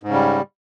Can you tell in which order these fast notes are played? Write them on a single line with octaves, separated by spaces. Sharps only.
G#2 C#3 G3